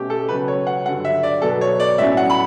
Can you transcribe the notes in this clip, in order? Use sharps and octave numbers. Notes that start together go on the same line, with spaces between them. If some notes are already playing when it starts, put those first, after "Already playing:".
Already playing: B2 A3 C#4 G4
A4
C#2 C#3 F#3 C#4 B4
C#5
F#5
G2 D3 F#3 F#5
E5
D5
B2 F#3 B3 A4
C#5
D5
A2 F#3 C#4 E5
F#5
B5